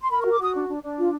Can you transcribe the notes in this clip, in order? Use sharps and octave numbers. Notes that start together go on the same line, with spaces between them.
C6
A#4 B5
C#6
F#4
D6
F#4 D#6
D4
D4
D4
F4